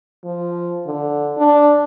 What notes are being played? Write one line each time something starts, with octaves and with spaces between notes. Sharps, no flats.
F3
D3
D4